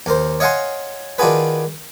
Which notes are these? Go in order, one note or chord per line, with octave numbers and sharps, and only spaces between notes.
D#2 A#4 C5
C#5 D#5 F5 F#5 G#5 C6
D#3 D4 F4 F#4 G#4 B4